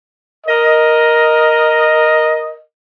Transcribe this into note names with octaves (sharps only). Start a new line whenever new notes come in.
A#4 D#5